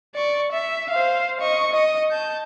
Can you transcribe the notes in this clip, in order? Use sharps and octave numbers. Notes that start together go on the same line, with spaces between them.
D5 C#6
E5
C5 F5
D#5 C#6
D#5
A5 G6